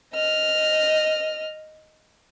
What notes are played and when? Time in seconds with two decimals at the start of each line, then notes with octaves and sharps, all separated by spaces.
0.14 D#5 F6